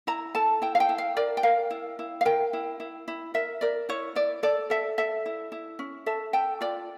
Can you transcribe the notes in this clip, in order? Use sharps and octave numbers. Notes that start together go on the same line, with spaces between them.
E4 A#5
A4 A5
E4 G5
F5
G5
E4
F5
A#4 D5
G5
A#4 F5
E4
E4
F5
A#4 G5
E4
E4
E4
A#4 E5
A#4 D5
E4 C#5
E4 D5
A4 D5
A4 E5
A4 E5
E4
E4
C#4
A4 E5
A4 G5
F4 D5